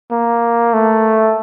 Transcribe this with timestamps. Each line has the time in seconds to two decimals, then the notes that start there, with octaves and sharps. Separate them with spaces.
0.11 A#3
0.73 A3